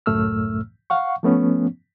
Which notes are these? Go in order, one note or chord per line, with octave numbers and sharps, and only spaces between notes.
C#2 F#2 A2 A3 E6 F6
F5 F#5 C#6
F3 A3 B3 C#4